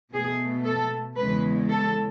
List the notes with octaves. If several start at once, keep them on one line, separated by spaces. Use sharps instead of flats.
B2 A3 G#4
A4
E2 C#3 G#3 B4
A4